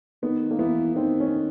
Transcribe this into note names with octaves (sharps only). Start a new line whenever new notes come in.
D#3 B3
A#3
E3 B3
D#3 C4
C#4